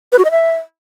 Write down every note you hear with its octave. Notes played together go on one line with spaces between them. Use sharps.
B4
F#4
D#5
E5